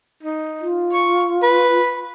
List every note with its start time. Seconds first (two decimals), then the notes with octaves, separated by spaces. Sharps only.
0.23 D#4
0.61 F4
0.93 C#6
1.43 B4